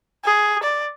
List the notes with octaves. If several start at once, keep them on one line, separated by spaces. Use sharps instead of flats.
G#4
D5